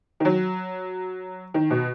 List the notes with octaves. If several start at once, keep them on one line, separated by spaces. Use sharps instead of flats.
D#3
F#3
D#3
B2